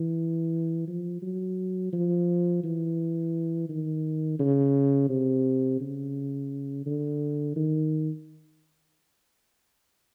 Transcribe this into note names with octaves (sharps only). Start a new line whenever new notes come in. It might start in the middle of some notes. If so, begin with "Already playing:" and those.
Already playing: E3
F3
F#3
F3
E3
D#3
C#3
C3
C#3
D3
D#3